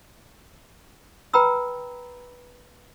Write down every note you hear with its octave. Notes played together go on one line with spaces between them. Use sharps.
B4 G5 A#5 B5 E6